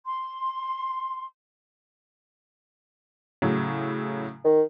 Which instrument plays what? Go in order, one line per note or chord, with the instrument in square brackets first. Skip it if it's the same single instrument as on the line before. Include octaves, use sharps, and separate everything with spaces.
[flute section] C6
[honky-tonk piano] A2 C#3 F#3
[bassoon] D#3